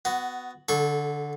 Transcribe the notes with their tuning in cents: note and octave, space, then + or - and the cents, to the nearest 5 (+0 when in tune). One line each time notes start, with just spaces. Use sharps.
B3 +20 F#4 +0
D3 +0 A4 -30 C#6 +0